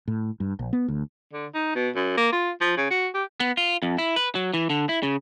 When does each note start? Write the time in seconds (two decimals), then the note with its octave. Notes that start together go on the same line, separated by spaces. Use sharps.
0.08 A2
0.40 G2
0.59 A#1
0.73 B3
0.88 D2
1.33 D3
1.54 D#4
1.75 B2
1.95 F#2
2.17 A#3
2.32 F4
2.61 F3
2.77 C#3
2.91 F#4
3.14 G4
3.40 B3
3.57 F4
3.82 F2
3.98 E4
4.16 B4
4.35 F#3
4.54 E3
4.70 D3
4.89 E4
5.03 C#3